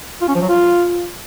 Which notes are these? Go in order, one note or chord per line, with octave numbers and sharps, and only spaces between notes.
F4
C#4
F3
F#3
F4